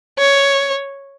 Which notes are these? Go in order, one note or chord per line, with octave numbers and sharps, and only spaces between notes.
C#5